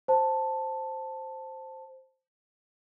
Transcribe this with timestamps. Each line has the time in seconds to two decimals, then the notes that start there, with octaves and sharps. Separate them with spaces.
0.08 C5 A5